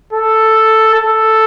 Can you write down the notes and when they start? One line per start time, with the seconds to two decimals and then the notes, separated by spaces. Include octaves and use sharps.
0.13 A4
0.95 A4